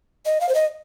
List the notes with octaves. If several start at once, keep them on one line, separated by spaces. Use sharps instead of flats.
D#5
F5
C5
D#5